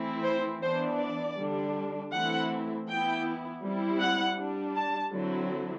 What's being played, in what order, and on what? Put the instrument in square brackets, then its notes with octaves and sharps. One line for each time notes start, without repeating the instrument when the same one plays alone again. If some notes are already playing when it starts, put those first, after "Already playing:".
Already playing: [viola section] E3 A3 C4 E4
C5
E3 B3 D4 C5
D5
D3 G3 D4
E3 A3 C4 E4 F#5
E3 B3 E4 G5
G3 C4 E4
F#5
G3 D4
A5
D3 F#3 C4 E4